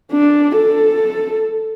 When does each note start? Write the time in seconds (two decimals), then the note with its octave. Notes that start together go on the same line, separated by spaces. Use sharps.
0.12 D4
0.57 A4